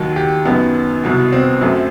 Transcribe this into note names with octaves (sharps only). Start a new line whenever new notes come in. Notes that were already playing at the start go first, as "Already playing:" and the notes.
Already playing: D#2 D#3 F#3
G4
F#2 D#3 F#3 B3
C2 B2 F#3
C4
F#2 F#3 A3